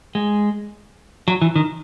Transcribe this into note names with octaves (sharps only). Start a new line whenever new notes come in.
G#3
F#3
E3
D#3